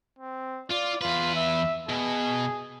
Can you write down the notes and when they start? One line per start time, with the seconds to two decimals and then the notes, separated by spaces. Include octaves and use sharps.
0.19 C4
0.70 F4 D5
1.01 E2 F4 B4
1.36 E5
1.89 B2 G#4